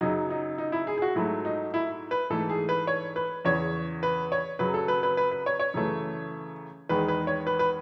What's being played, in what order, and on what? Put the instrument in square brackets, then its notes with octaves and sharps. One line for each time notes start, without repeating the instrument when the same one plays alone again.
[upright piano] F#2 C#3 F#3 D#4
D#4
D#4
E4
G#4
G#4
F#4
G#2 F#3 A3 E4
D#4
E4
B4
G#2 E3 A3 A4
G#4
B4
C#5
B4
E2 C#3 E3 C#5
B4
C#5
F#2 C#3 F#3 B4
A4
B4
B4
B4
B4
C#5
C#5
F#2 C#3 E3 A3
E2 D#3 G#3 B4
B4
C#5
B4
B4